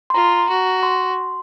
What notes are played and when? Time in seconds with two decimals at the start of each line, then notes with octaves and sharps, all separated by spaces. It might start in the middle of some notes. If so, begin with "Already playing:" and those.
0.10 C6
0.14 F4 A#5
0.49 F#4
0.83 C6